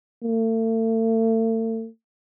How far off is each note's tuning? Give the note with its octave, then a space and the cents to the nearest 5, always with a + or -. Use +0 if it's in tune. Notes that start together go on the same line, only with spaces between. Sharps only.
A3 +40